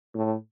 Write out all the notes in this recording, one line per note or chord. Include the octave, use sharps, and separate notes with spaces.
A2